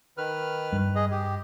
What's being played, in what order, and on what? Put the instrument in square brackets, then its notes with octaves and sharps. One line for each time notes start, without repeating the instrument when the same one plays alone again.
[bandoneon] D#3 B4 F6
[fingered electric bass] G2 G3
[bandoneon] G#4 D#5
G4